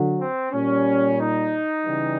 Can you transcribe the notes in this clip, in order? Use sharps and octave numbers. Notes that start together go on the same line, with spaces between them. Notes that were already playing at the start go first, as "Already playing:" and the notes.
Already playing: D3 F#3
C4
A#2 G3 C#4
D#4
C#3 E3 G3